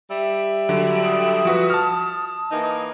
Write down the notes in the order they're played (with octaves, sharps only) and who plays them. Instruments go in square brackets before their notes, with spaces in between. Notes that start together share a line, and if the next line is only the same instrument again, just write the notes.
[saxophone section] G3 E5
[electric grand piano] D3 F#3
[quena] D#6
[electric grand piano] F3 F#4 B4
A5 F6
[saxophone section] E3 A#3 D#4